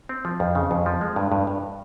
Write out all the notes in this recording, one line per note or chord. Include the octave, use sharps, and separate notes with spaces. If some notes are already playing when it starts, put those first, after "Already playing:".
C4
F3
F2
C#3
F2
F3
G#3
G2
G2
G2